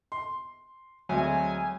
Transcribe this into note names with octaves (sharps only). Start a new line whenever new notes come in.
C6
D2 F#3 G#3 C4 G#5